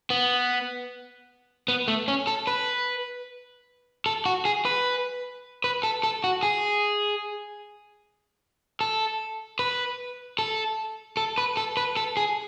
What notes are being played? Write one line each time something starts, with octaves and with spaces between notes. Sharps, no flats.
B3
B3
A3
C#4
A4
B4
A4
F#4
G#4
B4
B4
A4
A4
F#4
G#4
A4
B4
A4
A4
B4
A4
B4
A4
G#4